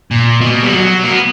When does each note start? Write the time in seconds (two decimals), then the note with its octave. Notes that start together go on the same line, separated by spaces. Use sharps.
0.11 A#2
0.41 B2
0.63 G3
0.72 F#3
1.04 A#3
1.11 B3